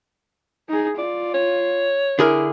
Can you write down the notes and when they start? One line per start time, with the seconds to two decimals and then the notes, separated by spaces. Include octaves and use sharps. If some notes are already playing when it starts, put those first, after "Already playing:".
0.69 D#4 G#4
0.98 F4 D5
1.34 C#5
2.19 D3 E4 G#4 A#4